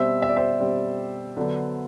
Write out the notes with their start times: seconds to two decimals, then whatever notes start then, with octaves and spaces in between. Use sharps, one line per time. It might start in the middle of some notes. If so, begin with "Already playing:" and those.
Already playing: B2 G3 C4 C5 E5
0.22 E5
0.29 D5
0.37 C5 E5
0.60 B2 G3 C4
1.37 D3 F#3 B3 D4